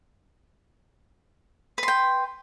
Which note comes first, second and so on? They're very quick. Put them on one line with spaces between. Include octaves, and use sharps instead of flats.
B4 C6 G5